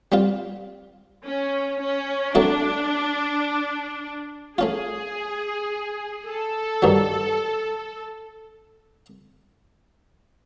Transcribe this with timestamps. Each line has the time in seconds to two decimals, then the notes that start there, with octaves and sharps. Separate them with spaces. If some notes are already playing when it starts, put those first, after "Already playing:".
0.12 G3 C4 F4
1.24 C#4
1.80 C#4
2.35 F#3 A3 C4 D4 E4 A4
4.58 A3 C#4 F4 G#4
6.26 A4
6.82 G2 D#3 F#3